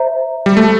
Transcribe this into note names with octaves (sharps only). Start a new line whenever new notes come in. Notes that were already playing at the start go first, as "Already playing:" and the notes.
Already playing: C5 E5 A#5
G3
A3